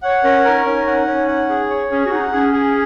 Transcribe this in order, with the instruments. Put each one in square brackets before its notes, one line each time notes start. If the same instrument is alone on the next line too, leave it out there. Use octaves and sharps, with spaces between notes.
[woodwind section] C#5 [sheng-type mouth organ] F#5
[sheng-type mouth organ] C#4 [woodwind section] A#4
[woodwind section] D#4 [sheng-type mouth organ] A#4
[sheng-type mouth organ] C#4 [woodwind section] D#4
[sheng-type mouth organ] F#5
C#4
F#5
G#4
C#5
[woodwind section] C#4 [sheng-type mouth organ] G#4
[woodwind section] F#4
[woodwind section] D#4 [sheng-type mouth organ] F#5
[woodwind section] C#4 [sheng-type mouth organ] G#4
[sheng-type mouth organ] G#4